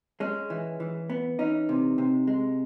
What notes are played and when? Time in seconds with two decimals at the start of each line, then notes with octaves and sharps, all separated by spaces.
0.20 G#3 C#4
0.50 E3
0.80 E3
1.10 B3
1.39 E3 C#4 D#4
1.69 C3
1.98 C3
2.28 G#3